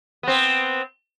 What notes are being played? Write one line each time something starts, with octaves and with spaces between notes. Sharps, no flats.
B3 C4